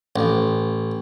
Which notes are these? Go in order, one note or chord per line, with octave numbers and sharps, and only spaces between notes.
A1